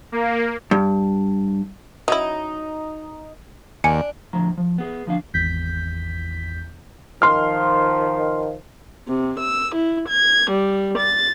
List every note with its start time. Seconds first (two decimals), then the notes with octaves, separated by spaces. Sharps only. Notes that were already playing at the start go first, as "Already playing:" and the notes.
0.12 A#3
0.71 G2
2.08 F#3 C#4 D#4 E4
3.84 D#2 D4 G#5 C#7
4.33 A2 D3 F3 A#5
4.57 F3
4.78 B3 G#4
5.06 D2 F3 A3 D4 F5
5.34 G#1 E2 G6 B6
7.22 D#3 F3 C6 F6
9.08 C3
9.40 E6
9.74 E4
10.08 G#6
10.51 G3
10.98 A6